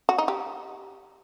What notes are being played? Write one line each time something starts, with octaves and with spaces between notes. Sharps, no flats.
F#4
D#4
G4